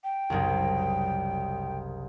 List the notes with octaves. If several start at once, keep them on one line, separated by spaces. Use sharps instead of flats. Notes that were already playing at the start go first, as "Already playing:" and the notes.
G5
F#1 C2